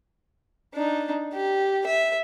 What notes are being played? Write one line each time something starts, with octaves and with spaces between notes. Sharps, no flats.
D4 D#4
G4
E5